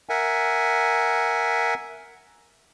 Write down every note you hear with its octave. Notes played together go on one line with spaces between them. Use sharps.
A#4 E5 F#5 G#5